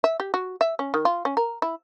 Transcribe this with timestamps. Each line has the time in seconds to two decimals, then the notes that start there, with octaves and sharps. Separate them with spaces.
0.04 E5
0.20 G4
0.34 F#4
0.61 E5
0.79 C#4
0.94 D#3
1.05 F4
1.25 C#4
1.37 A#4
1.62 E4